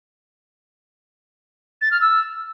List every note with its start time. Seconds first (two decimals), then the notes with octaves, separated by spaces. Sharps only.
1.82 A6
1.91 F6
2.01 E6